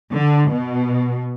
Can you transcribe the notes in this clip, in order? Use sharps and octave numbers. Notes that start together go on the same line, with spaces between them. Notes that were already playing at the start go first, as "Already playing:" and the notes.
D3
B2